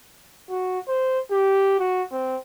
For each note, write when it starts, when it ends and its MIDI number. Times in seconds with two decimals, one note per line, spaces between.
0.49 0.79 66
0.88 1.19 72
1.31 1.77 67
1.79 2.03 66
2.11 2.37 60